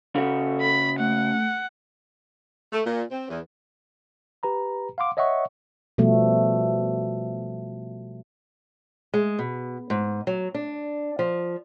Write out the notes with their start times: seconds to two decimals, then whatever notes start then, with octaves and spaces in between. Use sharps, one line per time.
0.16 C#3 F#4 A4
0.61 B5
0.99 A3 F#5
2.73 A3
2.85 A#2
3.12 C4
3.29 E2
4.43 G4 B4 A#5 B5
4.98 F5 F#5 C6 D6
5.17 C#5 D#5 E5 F#5 C#6
5.98 B2 F3 G3 A3
9.14 G#3
9.39 B2
9.90 G#2
10.27 F#3
10.54 D4
11.19 F3